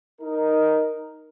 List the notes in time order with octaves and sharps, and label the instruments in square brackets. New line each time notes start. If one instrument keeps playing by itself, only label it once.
[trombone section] D#4 A#4